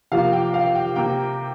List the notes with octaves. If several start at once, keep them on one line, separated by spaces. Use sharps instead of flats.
C3 F3 A#3 F5
G5
F5
G5
C3 A#3 G5